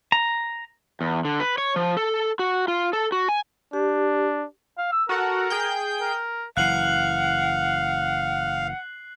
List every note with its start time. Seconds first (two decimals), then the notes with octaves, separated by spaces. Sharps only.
0.12 A#5
1.01 E2
1.25 D3
1.40 B4
1.58 C#5
1.76 F3
1.97 A4
2.39 F#4
2.68 F4
2.93 A4
3.12 F#4
3.29 G#5
3.73 D4 G4
4.78 F5
4.92 E6
5.09 F#4 A4 A#4 F#5
5.50 G#4 G5 G6
6.01 A#4
6.57 F#1 E3 F5 F#5 F#6 C7 F#7